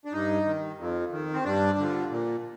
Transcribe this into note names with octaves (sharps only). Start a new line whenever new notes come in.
D4
G2 D#4
D#3
F2
D#3
C4
G2 D4
D3 F3
A#2